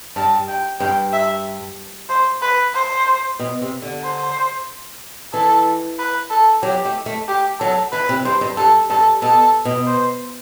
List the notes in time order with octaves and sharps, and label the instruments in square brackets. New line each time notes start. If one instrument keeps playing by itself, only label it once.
[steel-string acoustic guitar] G2 [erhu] A5
[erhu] G5
[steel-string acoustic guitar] G2 [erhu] G5
[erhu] E5
C5
B4
C5
[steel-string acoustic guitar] B2
C3
D3
[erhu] C5
[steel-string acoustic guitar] E3 [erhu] A4
[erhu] B4
A4
[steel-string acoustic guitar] F#3 [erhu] G4
[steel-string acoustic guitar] A3
A3
[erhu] G4
[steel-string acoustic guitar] F#3 [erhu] A4
[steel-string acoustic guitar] E3 [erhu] B4
[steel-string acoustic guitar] C3
[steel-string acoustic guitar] G2 [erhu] C5
[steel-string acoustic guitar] G2
[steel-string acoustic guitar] G2 [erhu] A4
[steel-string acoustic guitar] G2 [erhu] A4
[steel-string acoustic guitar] B2 [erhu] A4
[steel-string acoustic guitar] B2
[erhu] C5